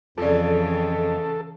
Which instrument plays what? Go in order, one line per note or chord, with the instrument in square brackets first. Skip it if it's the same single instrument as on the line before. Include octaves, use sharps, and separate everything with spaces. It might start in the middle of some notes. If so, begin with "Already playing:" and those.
[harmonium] F2 [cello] C#3 E3 [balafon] F4 D5 [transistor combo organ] A4